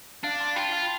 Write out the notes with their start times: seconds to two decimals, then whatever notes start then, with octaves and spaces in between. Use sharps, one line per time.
0.23 D4 F5 A5
0.40 A5 C6
0.55 F4 G5 B5
0.73 F5 A5